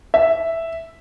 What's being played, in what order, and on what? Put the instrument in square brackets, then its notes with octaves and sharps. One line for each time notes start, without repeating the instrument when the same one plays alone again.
[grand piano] E5